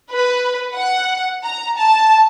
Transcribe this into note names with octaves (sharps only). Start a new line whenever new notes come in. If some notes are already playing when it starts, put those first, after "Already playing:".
B4
F#5
A#5
A5